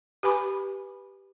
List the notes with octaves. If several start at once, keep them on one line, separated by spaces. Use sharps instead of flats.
G4 B4 G#5 B5 D6